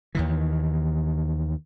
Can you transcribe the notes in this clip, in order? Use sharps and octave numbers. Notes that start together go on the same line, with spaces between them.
D#2 D#3 E3